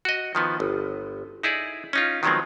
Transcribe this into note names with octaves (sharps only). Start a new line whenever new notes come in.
F#4 D#5
D#3 F3 B3
G1
D#4 E4 G#4 D5
C#4 D#4 F4
D#3 F3 F#3 G#3 B3 C4